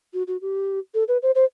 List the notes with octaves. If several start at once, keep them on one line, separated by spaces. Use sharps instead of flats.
F#4
F#4
G4
A4
B4
C5
C5